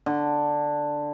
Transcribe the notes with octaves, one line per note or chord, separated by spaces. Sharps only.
D3